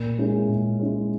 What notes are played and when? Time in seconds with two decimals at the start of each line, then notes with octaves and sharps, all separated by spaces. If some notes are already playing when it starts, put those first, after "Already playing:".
Already playing: A#2
0.18 G#3 C#4 E4 G#4
0.49 A#2
0.80 G#3 C#4 E4 G#4